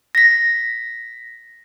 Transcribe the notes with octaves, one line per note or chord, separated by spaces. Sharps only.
A#6 B6